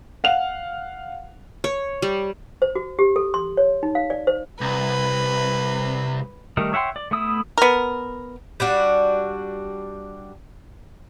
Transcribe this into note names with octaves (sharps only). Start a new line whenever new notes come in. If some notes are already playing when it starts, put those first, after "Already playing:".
F5 F#5 F7
C#5
G3
C5
F#4
G4
A4
C6
C#5
D#4
F5
D5
C5
C2 B4
D#3 G3 A3 D#4 A#4
C#5 E5 F#5 G5 C6
D5
A3 B3 E4 D#6 E6
B3 A#4
G3 D4 F#4